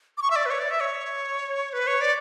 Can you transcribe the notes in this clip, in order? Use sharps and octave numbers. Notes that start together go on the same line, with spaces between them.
D6
C#6
E5
D5
B4
C#5
D5
E5
C#5
B4
C#5
D5